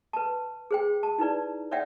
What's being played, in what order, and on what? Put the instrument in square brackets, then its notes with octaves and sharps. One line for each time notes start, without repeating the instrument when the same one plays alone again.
[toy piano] B4 A5
G#4 C5 G5
A5
D#4 E4 B4 D5
C#5 D5 E5 F#5 G5